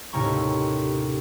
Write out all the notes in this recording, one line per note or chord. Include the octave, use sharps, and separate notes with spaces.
D#2 A2 C3 C#4 A#5 C#6